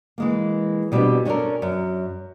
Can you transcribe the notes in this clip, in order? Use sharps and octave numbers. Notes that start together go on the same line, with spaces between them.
E3 G#3 A#3
B2 G3 B3 C4 D4
C#4 D4 F#4 A4 A#4
F#2